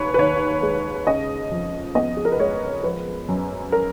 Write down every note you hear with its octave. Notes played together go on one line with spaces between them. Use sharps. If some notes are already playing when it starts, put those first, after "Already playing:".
Already playing: D#2 B4 C#5
B4
D#2 C#5
G#3
C#3 D#5
F2
B3 D#5
G#4
A#4
B4
G#3 C#5
F3 B4
F#2
A#4